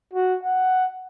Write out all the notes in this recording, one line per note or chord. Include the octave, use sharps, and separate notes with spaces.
F#4
F#5